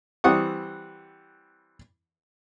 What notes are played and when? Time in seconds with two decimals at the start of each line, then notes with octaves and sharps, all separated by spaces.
0.24 E3 G3 C4 F#5 C#6 D#6